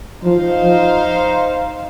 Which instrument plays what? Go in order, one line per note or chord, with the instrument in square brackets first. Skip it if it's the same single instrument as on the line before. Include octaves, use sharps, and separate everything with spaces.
[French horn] F3 [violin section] D#4 C5 F5
[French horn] F3